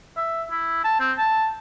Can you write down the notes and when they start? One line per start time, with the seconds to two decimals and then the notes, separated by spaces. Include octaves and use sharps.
0.17 E5
0.51 E4
0.84 A5
1.00 C4
1.18 A5